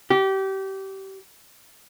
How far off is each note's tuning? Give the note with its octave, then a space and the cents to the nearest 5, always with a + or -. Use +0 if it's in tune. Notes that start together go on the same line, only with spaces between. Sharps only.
G4 -25